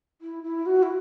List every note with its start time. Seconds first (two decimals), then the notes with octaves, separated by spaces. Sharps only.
0.21 E4
0.43 E4
0.66 F#4
0.83 E4